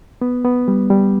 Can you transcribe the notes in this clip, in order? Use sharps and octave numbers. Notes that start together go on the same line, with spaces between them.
B3
B3
G3
G3